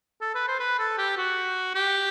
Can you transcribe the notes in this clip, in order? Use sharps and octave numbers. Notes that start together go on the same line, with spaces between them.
A4
B4
C5
B4
A4
G4
F#4
G4